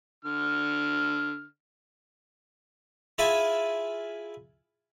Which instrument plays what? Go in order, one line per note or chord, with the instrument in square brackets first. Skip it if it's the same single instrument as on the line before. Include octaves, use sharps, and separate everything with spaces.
[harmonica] D3 F6
[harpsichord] E4 F4 G#4 E5 G#5 A5